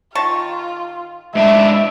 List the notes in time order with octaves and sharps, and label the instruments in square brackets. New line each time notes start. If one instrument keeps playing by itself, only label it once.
[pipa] D#3 A5 C#6 [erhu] F4
[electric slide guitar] G#2 D4 E4 [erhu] E5